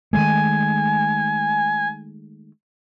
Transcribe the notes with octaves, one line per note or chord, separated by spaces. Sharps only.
D#3 G#3 A3 G#5